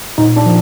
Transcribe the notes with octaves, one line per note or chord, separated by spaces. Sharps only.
A#2 D#4
D4
F3